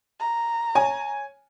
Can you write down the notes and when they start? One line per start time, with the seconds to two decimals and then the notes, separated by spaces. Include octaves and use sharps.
0.20 A#5
0.75 C#5 G#5